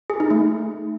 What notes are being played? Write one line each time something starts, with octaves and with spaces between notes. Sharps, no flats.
G#4
D#4
A3